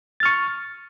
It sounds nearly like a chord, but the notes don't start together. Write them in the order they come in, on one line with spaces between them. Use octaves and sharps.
A6 F6 C#6